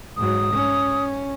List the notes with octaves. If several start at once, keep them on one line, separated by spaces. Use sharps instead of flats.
G#2 F#3 D#6
C#4